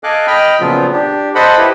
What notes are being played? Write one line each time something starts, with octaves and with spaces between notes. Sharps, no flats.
A4 D#5 F5 G#5 D6 F#6
D#5 G5 B5 F6
A#2 C#3 F3 F#3 B3 F4
D4 G4
A4 C5 D#5 F#5 B5
E4 G4 B4